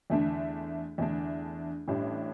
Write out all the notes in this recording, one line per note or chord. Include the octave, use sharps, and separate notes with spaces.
E2 D3 A3 D4
E2 D3 A3 D4
A1 A2 G3 D4